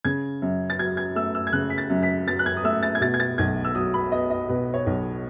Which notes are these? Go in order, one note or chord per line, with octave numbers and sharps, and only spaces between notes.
C#3 G#6
F#2
A6
F#3 G#6
G#6
A3 E6
E6
G#6
C#3 F#6
B6
A6
F#2
B6
F#3 A6
F#6
G#6
D#6
A3 E6
A6
G#6
B2 A6
G#6
A6
B1 G#6
E6
F#3 D#6
B5
B3 D#5
D#5
B2 B4
C#5
B1